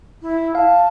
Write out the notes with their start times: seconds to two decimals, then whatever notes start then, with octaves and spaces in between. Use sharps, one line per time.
0.22 E4
0.55 F5 A5